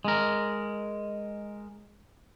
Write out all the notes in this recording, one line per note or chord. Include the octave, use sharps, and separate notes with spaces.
G#3 A#4